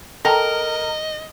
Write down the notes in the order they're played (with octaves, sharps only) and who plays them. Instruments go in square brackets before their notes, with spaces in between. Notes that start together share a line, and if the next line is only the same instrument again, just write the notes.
[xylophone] A4 G5 A5 [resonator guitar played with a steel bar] A#4 [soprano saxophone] D#5 [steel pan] A#5